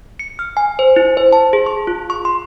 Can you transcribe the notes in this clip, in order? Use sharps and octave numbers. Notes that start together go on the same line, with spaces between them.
C#7
F6
G#5
C5
E4
C5
A5
G#4
C#6
F4
C#6
C6